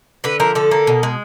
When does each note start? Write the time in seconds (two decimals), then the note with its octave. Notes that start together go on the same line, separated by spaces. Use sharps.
0.24 D3 B4
0.40 F3 A#4
0.55 D3 A4
0.71 A#3
0.87 B2
1.03 G#3